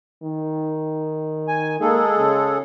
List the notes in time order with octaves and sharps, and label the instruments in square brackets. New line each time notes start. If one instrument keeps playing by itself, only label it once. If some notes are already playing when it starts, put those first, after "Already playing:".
[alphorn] D#3
[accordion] G#5
[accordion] G#3 G#4 A4 [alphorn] A#3
[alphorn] C#3